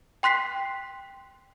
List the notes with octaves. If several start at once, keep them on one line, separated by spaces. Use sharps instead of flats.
G5 C6 F#6 B6 C7